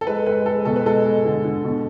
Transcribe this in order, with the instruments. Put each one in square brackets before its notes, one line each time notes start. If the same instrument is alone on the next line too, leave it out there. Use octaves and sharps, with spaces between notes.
[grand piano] A4
G#3 B4
G#3 B4
G#3 A4
B2 A4
B4
G#3 A4
G#3
D3
D3
B2